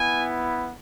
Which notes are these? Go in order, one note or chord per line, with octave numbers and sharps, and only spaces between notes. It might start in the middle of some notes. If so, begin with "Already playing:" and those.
Already playing: B3 E4 G#5